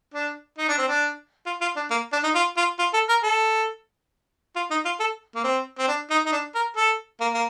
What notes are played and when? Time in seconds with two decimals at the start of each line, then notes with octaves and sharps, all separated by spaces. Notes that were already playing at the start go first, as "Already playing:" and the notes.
0.14 D4
0.58 D#4
0.68 D4
0.78 C4
0.89 D4
1.46 F4
1.61 F4
1.76 D4
1.91 A#3
2.13 D4
2.24 D#4
2.35 F4
2.57 F4
2.79 F4
2.94 A4
3.09 A#4
3.24 A4
4.56 F4
4.71 D#4
4.85 F4
5.00 A4
5.35 A#3
5.44 C4
5.79 C4
5.88 D4
6.11 D#4
6.26 D#4
6.32 D4
6.55 A#4
6.77 A4
7.21 A#3
7.34 A#3